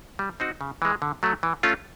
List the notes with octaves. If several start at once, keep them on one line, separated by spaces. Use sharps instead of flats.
G3
C4 D#4 F#4
C#3
E3 G#3
D3
F#3 A3
E3
A3 C#4 F4